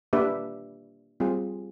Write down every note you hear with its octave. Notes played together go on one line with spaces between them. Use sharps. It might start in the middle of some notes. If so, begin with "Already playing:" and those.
A#3 D4 G4 B4 E5
G3 C4 F4 G#4